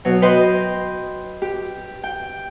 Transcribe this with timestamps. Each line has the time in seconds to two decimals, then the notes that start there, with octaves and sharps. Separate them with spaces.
0.05 B2 F#3
0.22 B4 D#5 G5 C6
1.42 G4
2.04 G5